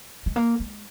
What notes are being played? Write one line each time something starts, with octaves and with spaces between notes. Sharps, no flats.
G#3
A#3
G#3